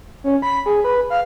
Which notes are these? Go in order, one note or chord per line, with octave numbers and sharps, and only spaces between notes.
C#4
B5
G#4
B4
F5